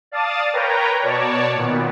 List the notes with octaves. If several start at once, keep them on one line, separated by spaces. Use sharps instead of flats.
D5 F5 A5 D#6 A6
A#4 B4 C#5 G5 A#5
B2 C#5 D5 A5
A#2 D#3 B3